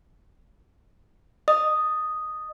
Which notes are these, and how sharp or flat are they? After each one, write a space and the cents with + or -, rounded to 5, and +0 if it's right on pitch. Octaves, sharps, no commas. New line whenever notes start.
D#5 -25 D#6 +0